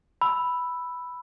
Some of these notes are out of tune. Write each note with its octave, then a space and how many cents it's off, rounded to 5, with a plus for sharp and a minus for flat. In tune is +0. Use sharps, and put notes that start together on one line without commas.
B5 +0 E6 +0